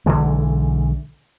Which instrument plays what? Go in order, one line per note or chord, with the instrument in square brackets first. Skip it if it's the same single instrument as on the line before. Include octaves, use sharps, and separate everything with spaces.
[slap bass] B1 D3 E3 G#3